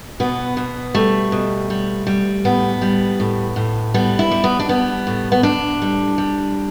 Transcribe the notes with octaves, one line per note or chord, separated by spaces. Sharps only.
B2 B3
B2
G3 A3
B2
G3
G3
A2 B3
G3
A2
A2
G3 B3
E4
G3
B3
D4
G3 B3
A2
B3
A2 D4
G3
G3